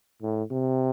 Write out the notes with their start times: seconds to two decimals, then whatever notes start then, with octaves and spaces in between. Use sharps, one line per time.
0.22 A2
0.51 C3